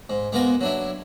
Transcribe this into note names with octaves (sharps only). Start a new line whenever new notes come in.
G#2
G#3 A#3 B3 F4 F#4 A#4
F#3 D4 E4